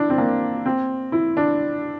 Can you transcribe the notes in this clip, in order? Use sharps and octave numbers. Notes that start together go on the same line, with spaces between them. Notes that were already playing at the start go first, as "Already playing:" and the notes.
Already playing: D4 E4
C4
A#3
C4
E4
D4